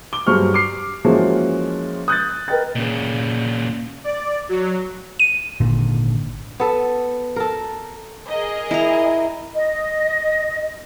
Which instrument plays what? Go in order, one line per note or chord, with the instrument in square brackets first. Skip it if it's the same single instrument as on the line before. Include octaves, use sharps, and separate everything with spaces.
[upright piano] D6 G7
G2 F#3 G#4 C5 C#6 F6
D6 C7
E3 F3 G#3 A#3 C#4 F#4
D#6 F#6 G6 A6
A#4 B4 D#5 G5 A6
[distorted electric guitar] A#2 C#3
[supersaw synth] D5
F#3
[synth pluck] D#7
[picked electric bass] G#1 A#2 D3
[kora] B3 A4
A4 A#4
[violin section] G#4 A#4 D#5
[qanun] E4 A#5
[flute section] D#5